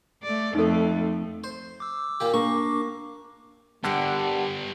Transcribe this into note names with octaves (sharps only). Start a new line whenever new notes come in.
A3 D5
F2 A3 D#4 A4
C5
D6 E6
A#2 A#3 G4
A#3 D4 C#6 D6
G2 D3 G3 B3 G4 A#4 F#5